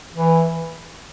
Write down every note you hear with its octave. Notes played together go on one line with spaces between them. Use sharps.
E3